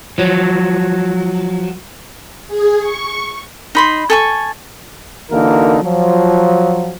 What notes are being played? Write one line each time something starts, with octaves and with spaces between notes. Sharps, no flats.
F3 F#3
G#4
C#6
D#4 B5 C6
A4 G#5 C#6
D3 E3 A#3 D#4 F#4 A#4
F3 F#3